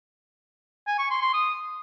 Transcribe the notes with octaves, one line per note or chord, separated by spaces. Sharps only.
G#5
C#6
C6
C6
D#6